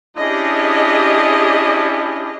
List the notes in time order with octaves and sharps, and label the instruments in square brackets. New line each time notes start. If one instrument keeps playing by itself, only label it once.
[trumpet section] C#4 D4 E4 [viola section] G4 G#4 D#5